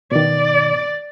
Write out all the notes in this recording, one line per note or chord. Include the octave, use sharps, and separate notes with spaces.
B2 D#3 D5